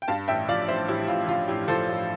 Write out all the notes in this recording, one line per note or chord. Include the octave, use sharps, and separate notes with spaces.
G5
G2 F5 A5
A1 E5 G5
F3 D5 F5
A1 C5 E5
A1 E4 G4
A1 F4
F3 F4
A1 E4 G4
F3 A4 C5
A1